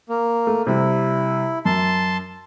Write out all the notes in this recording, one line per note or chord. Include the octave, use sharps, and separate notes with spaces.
A#3
A3
C3 G3 E4
F#2 A5 C6